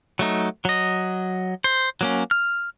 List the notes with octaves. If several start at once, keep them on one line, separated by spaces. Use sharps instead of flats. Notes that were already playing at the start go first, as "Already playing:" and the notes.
F#3 A3 D#4
F#3 D#5
C5
F#3 A#3 C#4
F6